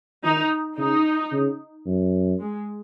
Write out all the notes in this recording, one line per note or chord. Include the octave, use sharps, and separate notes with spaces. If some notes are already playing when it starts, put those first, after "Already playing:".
D#3 D#4
C#3 D#4
C#3
F#2
G#3